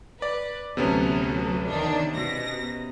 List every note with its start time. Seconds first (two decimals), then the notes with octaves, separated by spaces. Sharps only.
0.22 B4 D5
0.77 D2 C3 F#3 B3 C#4 A4
1.65 D#3 D4
2.13 B2 A#6